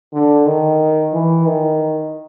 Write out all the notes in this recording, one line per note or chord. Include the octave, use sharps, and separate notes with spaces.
D3
D#3
E3
D#3